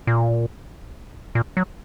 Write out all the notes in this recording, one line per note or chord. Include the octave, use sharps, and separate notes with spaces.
A#2
A#2
F#3